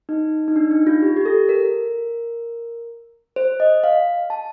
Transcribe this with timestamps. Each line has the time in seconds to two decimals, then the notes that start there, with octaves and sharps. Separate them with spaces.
0.09 D#4
0.48 D#4
0.56 D4
0.71 D#4
0.87 F4
1.02 G4
1.16 G4
1.26 A4
1.49 A#4
3.36 C5
3.60 D#5
3.84 F5
4.30 A5